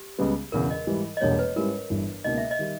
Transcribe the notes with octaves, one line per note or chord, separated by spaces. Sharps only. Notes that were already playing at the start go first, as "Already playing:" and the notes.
Already playing: G4
C#2 C#3 G3 B3
E1 E2 C#3 A#4
D#5
G#2 E3 G3
D#5
E1 E2 B2 G3 A#3 C#5
B4
G#2 G3 C#4 E4 A#4
G1 G2 E3 G3
C#2 B2 A#3 D#4 D#5
E5
D#5
D#3 G3